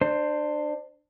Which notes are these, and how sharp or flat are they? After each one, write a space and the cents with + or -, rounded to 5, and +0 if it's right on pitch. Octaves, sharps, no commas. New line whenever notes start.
D4 +25 C5 +0